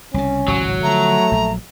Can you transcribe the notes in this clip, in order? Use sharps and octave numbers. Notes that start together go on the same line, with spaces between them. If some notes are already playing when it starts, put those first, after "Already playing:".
C2 C#3 C#4
G#1 C#2 A2 F#3
D3 F3 A3 A#5
A#1 F#3